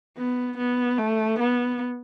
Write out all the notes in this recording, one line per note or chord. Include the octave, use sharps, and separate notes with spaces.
B3
B3
A3
B3